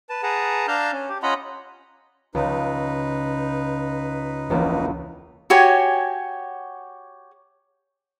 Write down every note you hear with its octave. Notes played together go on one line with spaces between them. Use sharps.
B4 A5
G#4 B4 F#5 A5 A#5
D4 F5 A5 A#5 F6 G6
C#4
G4
C#4 F4 D#5 F#5 A#5 B5
C#2 D#4 B4
E1 C#2 A#3
F#4 G4 C#5 G#5